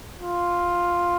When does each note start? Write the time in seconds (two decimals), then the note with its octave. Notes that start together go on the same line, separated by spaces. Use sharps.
0.20 F4